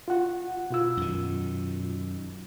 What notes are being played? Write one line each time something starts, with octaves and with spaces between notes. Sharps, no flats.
F4 F#5
B2 F4 E6
F#2 D#3